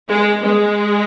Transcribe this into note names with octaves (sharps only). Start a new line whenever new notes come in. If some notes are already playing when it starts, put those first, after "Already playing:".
G#3
G#3